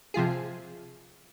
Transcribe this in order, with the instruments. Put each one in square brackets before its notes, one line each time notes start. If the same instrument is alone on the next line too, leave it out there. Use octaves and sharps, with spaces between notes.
[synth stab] C3 F3 F4 G#4